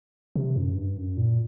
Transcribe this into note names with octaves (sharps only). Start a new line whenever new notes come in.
C3
F#2
G2
F#2
A#2